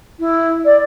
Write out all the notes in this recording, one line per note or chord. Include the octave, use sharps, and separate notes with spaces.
E4
D5